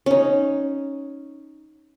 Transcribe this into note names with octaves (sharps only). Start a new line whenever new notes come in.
C#4 D#4